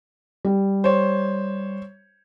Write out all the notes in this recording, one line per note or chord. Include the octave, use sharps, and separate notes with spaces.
G3
C5 C#5